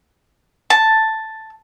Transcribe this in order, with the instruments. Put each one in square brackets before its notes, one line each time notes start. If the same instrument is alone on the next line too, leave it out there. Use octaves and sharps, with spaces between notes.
[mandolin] A5